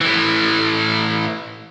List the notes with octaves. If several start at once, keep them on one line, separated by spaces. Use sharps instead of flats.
A2 E3